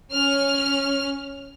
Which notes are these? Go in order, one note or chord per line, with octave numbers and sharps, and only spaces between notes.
C#4 F6